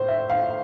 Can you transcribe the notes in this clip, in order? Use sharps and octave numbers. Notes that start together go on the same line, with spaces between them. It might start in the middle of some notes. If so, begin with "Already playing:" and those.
Already playing: A2 C5
E5
F5